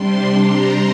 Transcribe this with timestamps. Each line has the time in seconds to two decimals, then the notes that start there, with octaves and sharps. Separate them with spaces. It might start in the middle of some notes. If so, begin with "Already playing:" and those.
Already playing: C3 G3 D4 C6
0.47 A#5